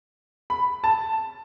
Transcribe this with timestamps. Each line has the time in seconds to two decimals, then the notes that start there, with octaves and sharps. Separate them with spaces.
0.50 B5
0.84 A5